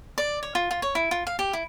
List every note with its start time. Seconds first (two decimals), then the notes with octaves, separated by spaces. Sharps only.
0.18 D5
0.43 C#5
0.55 F4
0.71 F4
0.82 C#5
0.95 E4
1.11 F4
1.27 F5
1.39 G4
1.53 E4